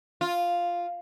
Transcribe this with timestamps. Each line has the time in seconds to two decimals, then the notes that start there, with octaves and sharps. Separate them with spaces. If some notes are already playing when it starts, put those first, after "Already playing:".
0.21 F4